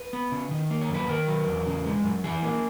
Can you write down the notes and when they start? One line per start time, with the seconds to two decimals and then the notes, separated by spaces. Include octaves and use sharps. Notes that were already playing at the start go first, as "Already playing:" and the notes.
Already playing: B4
0.13 B3
0.32 C#3
0.51 D#3
0.70 A#3
0.82 C#5
0.90 F#2 B4
1.09 D#3 A#4
1.27 F#3
1.46 E2
1.67 C#3
1.86 G#3
2.04 F#2
2.24 E3 G#4
2.42 A#3